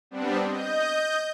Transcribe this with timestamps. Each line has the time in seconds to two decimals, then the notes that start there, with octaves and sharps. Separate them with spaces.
0.11 G3 B3 C4 D4
0.46 D#5 G6